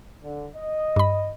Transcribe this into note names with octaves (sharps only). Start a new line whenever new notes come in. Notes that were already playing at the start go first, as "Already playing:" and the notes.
D3
D#5
G2 B5